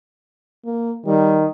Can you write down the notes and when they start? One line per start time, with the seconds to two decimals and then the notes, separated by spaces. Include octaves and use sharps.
0.65 A#3
1.06 D#3 G3